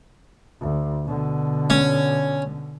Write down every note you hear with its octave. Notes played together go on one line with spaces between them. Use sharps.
D2
B2 D3
C#4